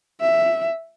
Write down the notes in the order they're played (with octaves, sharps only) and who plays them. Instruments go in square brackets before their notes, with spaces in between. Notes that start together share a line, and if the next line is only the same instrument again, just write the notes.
[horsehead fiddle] E5